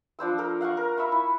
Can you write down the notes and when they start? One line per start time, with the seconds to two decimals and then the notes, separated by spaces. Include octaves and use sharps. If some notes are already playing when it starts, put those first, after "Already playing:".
0.19 F3 D4 C5 E6
0.38 A4 A#4
0.61 F5 F#5 A#5 C#6
0.77 A#4
0.97 E5 B5 C#6
1.12 E4